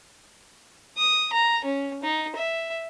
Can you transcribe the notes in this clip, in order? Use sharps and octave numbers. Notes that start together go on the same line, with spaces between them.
D#6
A#5
C#4
D#4
E5